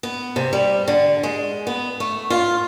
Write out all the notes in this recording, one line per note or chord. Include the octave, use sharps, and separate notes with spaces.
B3
C3
G3
D3
G#3
B3
A3
F4